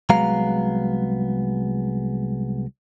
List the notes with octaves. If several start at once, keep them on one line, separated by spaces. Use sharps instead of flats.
C2 F#3 G#3 B3 F5 A#5